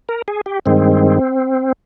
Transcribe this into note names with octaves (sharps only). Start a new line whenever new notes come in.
A#4
G#4
G4
G2 D#3 G#3 C4